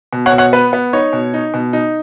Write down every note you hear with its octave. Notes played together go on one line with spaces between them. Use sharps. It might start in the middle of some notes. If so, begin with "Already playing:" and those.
B2
C#5 F#5
B2
C#5 F#5
B3 B4
B3
D#4 C#5
B2
D#4
B2
D#4